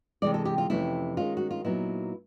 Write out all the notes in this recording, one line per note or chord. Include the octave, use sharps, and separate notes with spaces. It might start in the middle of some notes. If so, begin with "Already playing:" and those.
C3 E3 G#3 D5
A4
G4
F4
F2 C3 E3 A3 C#4 E4
D#3 G#3 C#4 F4
F#4
F4
A#2 F#3 B3 D#4 E4